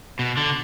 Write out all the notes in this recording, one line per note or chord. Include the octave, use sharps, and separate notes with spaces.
B2
D3